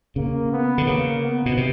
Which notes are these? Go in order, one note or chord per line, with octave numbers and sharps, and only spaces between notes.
C#3 A#3
B3
D3
C#3 A#3
B3
B2
C3